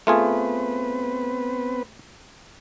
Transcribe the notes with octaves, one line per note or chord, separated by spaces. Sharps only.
A3 B3 C4 F4 G#4 B4